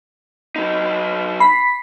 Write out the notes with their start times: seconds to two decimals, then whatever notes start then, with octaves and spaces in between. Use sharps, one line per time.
0.56 F#3 D#4
1.40 B5 B6 C7